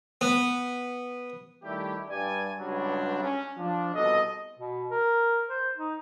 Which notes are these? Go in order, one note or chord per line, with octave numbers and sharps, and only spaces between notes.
B3
D#3 G3 A3 E4 G4
G2 D5 G#5
C#2 G2 F#3 G3 D4 C#5
C#4
F3 D4
C2 B2 A4 D#5
B2
A#4
C5
D#4